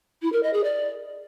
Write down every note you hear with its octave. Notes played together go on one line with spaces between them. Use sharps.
E4
A#4
D#5
G#4
D5